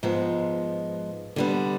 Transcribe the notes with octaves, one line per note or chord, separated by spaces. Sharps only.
G#2 F3 G#3 B3
D3 G3 B3